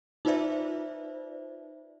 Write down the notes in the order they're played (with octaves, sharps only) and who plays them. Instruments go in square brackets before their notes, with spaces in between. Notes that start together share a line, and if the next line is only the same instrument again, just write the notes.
[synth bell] D#4 F4 B4 C5 D5 E5